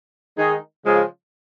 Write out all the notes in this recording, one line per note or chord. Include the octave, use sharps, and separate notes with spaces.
D#3 G#3 D#4 G#4
C#3 F3 G#3 F4 G#4